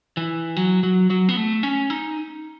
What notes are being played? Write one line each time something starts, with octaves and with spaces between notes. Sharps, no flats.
E3
F#3
F#3
F#3
B3
A3
C#4
D#4